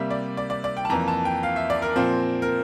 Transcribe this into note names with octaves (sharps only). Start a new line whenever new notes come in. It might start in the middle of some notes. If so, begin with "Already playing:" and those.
Already playing: C3 G3 A#3 E5
D5
D5
D5
D5
G5
A5
F2 E3 A#3 A#5
A5
G5
F5
E5
D5
A#4
A#2 F3 C4
A#4